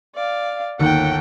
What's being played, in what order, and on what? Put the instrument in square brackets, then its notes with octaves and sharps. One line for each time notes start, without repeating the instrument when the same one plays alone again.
[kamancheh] D5 F5
[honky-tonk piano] G1 D#2 D#3 [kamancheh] F#5 G5